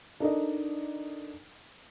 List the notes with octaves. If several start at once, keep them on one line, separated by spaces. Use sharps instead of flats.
D4 D#4 A4 A#4 D5 D#5